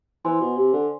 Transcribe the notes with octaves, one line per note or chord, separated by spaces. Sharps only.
E3 C5 G#5 C6
B2
C3
D3